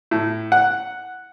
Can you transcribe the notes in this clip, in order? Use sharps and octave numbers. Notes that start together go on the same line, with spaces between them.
A2
F#5